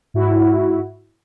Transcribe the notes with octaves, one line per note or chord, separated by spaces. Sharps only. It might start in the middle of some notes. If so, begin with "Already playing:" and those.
G#2 E4 F#4